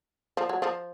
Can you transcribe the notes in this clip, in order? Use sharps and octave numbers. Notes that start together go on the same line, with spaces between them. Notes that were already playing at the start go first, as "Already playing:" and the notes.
F3
F#3
F3